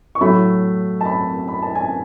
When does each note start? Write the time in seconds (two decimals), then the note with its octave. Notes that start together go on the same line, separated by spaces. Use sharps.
0.15 C#6
0.21 A2 F#3 A3 B5
1.01 A5
1.06 B5
1.48 B5
1.62 A5
1.75 G#5